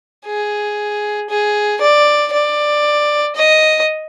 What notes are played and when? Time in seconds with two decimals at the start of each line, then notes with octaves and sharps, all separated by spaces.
0.27 G#4
1.30 G#4
1.81 D5
2.33 D5
3.36 D#5